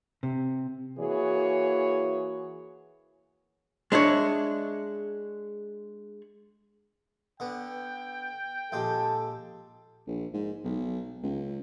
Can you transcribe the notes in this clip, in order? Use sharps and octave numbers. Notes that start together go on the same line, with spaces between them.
C3
E3 A#3 F#4 G#4 C#5
G#3 D4 E4 C#5
D3 B3 D4 G5
A#1 G#3 G4 A4
A#1
G#2
B1
C#2